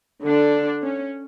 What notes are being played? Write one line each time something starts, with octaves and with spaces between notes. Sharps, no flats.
D3 D4
C#4